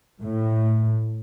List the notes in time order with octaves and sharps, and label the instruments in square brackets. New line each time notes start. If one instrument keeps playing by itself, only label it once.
[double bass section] A2